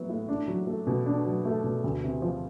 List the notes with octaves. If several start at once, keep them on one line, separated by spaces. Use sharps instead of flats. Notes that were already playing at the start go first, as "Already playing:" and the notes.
Already playing: F#3 B3 E4
A2
D4
F#3
A3
B2
D4
F#3
A3
B2
D2
C3
F3